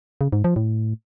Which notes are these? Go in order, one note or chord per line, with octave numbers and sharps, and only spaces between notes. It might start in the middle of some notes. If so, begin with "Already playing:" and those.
C#3
G#2
F3
A2